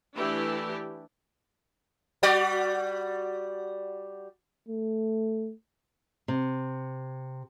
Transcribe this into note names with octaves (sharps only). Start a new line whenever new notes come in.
E3 A3 D4 E4 G4
G3 F#4 D5
A3
C3